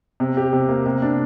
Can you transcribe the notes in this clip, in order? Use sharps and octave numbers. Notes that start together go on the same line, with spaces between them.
C3
G4
C3
A#3
C3
D4